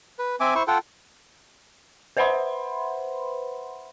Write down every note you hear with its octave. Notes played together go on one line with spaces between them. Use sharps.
B4
C4 E5 G#5 D6
E4 C5 C#6
F4 A4 F#5 G5
B4 C5 E5 F#5 B5 C6